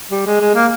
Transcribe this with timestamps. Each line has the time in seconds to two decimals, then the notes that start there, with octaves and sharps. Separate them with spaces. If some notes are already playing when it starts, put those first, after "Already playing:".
0.11 G3
0.26 G#3
0.41 G#3
0.55 A#3